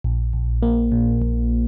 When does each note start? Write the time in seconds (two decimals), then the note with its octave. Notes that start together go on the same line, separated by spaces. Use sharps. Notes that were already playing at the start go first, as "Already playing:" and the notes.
0.04 A#1
0.33 A#1
0.63 A#3
0.92 A#2
1.22 A#1